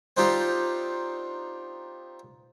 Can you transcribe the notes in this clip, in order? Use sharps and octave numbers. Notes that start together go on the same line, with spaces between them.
C4 D4 D#4 F4 G4